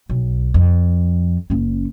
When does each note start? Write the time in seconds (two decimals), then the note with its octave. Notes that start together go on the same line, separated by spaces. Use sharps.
0.09 B1
0.54 F2
1.50 F#1 C#4